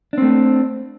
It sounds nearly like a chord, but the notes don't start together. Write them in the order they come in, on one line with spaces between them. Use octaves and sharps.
D4 C4 A3